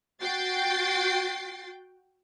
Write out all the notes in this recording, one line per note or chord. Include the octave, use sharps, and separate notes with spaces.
F#4 G5 A6 C7